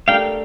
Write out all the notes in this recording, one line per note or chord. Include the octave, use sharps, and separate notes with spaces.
A3 D4 G4 A#4 F5 G5